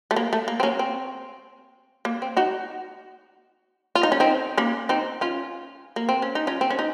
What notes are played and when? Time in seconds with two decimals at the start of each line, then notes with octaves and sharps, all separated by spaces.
0.11 A3
0.16 A#3
0.33 A3
0.48 A#3
0.60 C4
0.63 A#3 C#4
0.79 C4
2.05 A#3
2.22 C4
2.37 D#4 F#4
3.95 F4
4.03 D#4
4.12 C#4
4.20 C4 D#4
4.57 A#3 C#4
4.89 C4 D#4
5.21 C#4 F4
5.96 A#3
6.09 C4
6.22 C#4
6.35 D#4
6.47 C#4 F4
6.61 C4
6.70 C#4
6.79 D#4